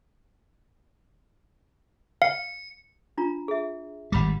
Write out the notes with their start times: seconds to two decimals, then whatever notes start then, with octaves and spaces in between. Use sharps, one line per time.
2.22 F5 C#7
3.18 D4 F4 A#5
3.48 G#4 E5
4.12 G#1 G3 F#5 B5 D6